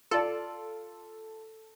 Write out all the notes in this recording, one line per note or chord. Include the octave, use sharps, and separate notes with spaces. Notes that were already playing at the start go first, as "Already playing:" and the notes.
F4 A4 D5